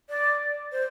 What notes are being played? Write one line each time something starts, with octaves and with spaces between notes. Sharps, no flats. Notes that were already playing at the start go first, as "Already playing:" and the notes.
D5
C5